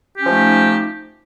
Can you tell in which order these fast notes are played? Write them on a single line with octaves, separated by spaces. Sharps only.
G4 C#4 F3 A3 D#4